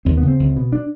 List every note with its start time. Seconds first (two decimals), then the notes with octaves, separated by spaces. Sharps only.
0.05 D#2 C4
0.17 B3
0.23 C#3
0.28 C4
0.40 C#2
0.56 B2
0.73 D4